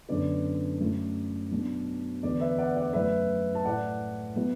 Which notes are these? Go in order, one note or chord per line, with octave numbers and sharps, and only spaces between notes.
F#2 D3 B3 D5
F#2 F#3 A3 E4
B2 F#3 D4
E2 D3 B3 D4 D5
B4 E5
D5 F#5
D5 F#5
F#2 F#3 A3 E4 B4 E5
A5
A2 A3 E4 D5 F#5
B2 F#3 B3 E4